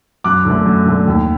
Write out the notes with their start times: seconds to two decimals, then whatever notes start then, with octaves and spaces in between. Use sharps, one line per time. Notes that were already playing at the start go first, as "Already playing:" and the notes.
0.24 F#2 D6 F#6
0.45 D3 A3
0.66 F#2
0.86 D3 A3
1.07 D#2